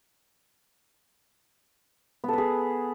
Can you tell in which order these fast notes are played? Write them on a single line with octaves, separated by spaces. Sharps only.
B3 A4 B4 G#4